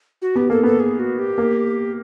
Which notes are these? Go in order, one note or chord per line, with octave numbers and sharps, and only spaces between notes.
F#4
B3 G4
A#3 A4
B3 A4
G#4
F#4
G4
A#3